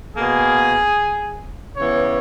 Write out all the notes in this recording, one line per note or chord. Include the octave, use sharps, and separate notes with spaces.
B2 A#3 G#4
C#3 E3 B3 C#5